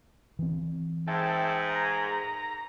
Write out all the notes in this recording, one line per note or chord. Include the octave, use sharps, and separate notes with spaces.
E3 C4
G#2 E5 G5 A5
A#5